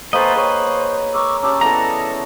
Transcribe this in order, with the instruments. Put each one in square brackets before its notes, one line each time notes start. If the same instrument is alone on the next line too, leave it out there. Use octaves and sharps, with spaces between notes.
[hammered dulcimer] A#3 G5 G#5 [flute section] A4 C5 C#6 [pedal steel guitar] B4 D#5
[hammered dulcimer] G#4 C#5 [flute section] C5 C#6
[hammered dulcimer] A#4 [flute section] C#6 D6 E6
[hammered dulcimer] C#4 G4 D5 [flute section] A5 D6 E6
[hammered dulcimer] E3 B3 G#4 [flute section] A4 D#5 [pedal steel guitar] A#5